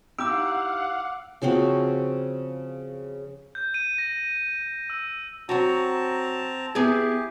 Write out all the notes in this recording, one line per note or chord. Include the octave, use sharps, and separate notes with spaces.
D#4 E4 G4 F5 F#5 D6 E6 D7
C#3 F3 C4 F#4
G6
D#7
A#6
E6
F#3 C4 F#4 A5 A#5
B3 E4 G4 G#4